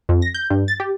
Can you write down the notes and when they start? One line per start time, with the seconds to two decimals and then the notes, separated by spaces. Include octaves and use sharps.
0.09 F2
0.22 A#6
0.34 G6
0.50 G2
0.68 A6
0.80 G4